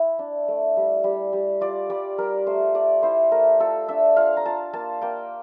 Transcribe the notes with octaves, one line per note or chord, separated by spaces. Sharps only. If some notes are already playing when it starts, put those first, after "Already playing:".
Already playing: E4
D4
A3
G3
G3
G3
F4 D5
G3 D5
G3 A#4
A3 C5
A3 D5
E4 C5
A3 A#4
F4 A4
D4 E5
F4 F5
A#5
F4 A5
A#3 A5
A#3 G5